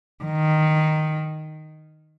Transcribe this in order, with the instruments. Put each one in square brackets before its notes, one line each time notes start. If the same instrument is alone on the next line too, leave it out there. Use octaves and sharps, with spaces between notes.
[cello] D#3